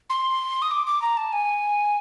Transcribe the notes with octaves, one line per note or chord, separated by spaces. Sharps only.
C6
D#6
D6
D6
A#5
A5
G#5